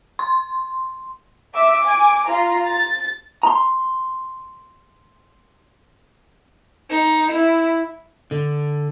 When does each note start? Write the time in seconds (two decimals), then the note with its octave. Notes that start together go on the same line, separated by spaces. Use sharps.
0.19 C6
1.54 E5 D6
1.84 G#5
2.27 F4 A#5
2.67 A6
3.43 A#5 C6
6.90 D#4
7.31 E4
8.31 D3